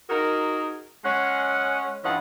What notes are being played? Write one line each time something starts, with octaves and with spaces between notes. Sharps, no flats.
D#4 F#4 G#4 A#4
G#3 C#4 F#5
G2 E3 C#4 F4 D#5 F#5